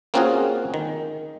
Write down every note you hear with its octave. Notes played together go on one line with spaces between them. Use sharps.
A#3 C4 C#4 F4 F#4 G#4
D#3